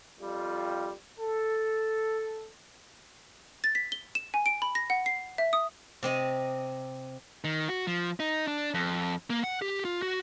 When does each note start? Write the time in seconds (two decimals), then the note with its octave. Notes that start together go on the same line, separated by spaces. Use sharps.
0.20 F2 G3 F4
1.19 A4
3.64 A6
3.75 B6
3.92 G7
4.15 E7
4.34 G#5
4.46 D7
4.62 B5
4.75 A#6
4.90 F#5
5.06 C7
5.38 E5
5.53 D#6
6.03 C3 C4 D#5
7.44 D#3
7.69 F#4
7.87 F3
8.20 D#4
8.47 D4
8.74 F2
9.30 A#3
9.44 F#5
9.62 G4
9.85 F4
10.02 F#4